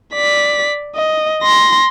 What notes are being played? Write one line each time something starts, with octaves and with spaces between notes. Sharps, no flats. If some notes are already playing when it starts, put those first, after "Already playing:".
D5 B6
D#5
C6 A#6